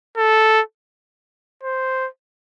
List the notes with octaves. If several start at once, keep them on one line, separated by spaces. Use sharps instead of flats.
A4
C5